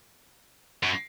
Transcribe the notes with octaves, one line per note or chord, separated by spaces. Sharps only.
F#2